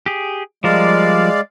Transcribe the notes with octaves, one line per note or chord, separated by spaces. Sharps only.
G4 G#4
F3 G3 G#3 A#4 D5 F5